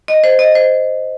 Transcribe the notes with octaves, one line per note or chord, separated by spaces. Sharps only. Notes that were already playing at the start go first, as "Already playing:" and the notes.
D#5
C5
D#5
C5